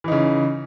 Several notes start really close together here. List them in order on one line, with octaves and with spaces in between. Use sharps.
E3 D#4 C#3